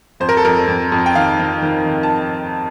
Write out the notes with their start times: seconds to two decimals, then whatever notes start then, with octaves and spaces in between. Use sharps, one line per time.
0.20 F2 C5
0.29 A#4
0.37 A4
0.45 F2 A#4
0.67 F2
0.92 F2
1.06 G5
1.15 D#3 F5
1.40 D#3
1.62 D#3
1.86 D#3
2.03 A5